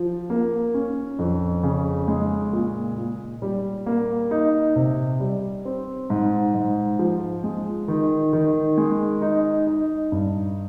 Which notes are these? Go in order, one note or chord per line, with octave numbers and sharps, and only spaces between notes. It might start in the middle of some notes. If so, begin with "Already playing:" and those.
Already playing: F3
A#3
C#4
F2
C#3
G#3
A#2
A#2
G3
A#3
D#4
C3
G3
C4
G#2
G#2
F3
G#3
D#3
D#3
G#3
D#4
D#4
G2